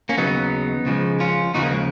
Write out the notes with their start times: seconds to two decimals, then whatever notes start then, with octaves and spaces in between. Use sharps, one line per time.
0.09 A#3 C#4
0.18 D#2 C#3 F#3 B3 D#4
0.86 C#2 C#3 F3 G#3
1.20 C#4 F4
1.54 D#2 C#3 F3 D#4 F#4
1.63 A#3
1.71 G#3